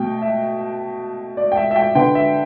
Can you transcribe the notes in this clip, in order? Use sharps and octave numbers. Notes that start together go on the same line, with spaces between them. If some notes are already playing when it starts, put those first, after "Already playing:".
Already playing: B2 A3 G5
E5
D5
G5
E5
E5
G5
D3 B3 G5
E5